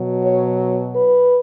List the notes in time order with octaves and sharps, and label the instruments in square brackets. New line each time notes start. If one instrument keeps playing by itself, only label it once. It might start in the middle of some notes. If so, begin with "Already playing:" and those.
Already playing: [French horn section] B2 F#3
C#5
B4